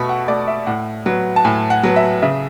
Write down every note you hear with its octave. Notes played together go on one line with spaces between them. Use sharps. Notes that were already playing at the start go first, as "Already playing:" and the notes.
Already playing: B2 A3 B5 C#6
F#5
A3 D5
E5
A2 F#5
F#3 B3
A5
A2 G#5
F#5
F#3 B3
E5
C#3 E5